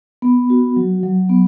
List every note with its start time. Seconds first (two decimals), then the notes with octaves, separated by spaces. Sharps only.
0.22 B3
0.50 F#4
0.76 F#3
1.03 F#3
1.29 B3